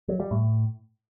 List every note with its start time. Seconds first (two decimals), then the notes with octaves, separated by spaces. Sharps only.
0.08 F#3
0.20 G3
0.31 A2